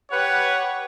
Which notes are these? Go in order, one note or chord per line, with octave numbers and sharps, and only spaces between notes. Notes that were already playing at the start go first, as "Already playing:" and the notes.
G4 B4 C#5 F#5